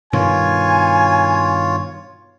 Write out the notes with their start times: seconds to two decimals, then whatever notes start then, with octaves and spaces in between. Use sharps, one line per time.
0.13 G2 B2 D#3 F4 C#5 G#5